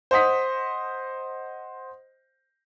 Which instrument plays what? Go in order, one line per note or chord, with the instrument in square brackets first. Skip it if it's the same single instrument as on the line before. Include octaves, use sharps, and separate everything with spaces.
[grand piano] C5 D#5 F#5 D#6 B6